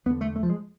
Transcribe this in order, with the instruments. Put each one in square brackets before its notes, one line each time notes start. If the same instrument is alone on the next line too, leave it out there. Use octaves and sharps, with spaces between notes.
[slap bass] E2 B3
D3
A3
A3
F3
G#3